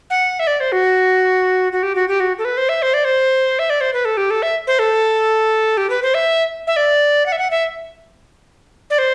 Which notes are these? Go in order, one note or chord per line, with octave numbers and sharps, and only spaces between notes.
F#5
E5
D5
C5
F#4
F#4
G4
F#4
G4
F#4
A4
B4
C5
E5
C5
D5
C5
E5
D5
C5
B4
A4
G4
A4
E5
C5
A4
G4
B4
C5
E5
E5
D5
F#5
E5
F#5
E5
D5
C5